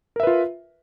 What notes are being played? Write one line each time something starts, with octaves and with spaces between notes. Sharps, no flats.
F4 A#4 B4 E5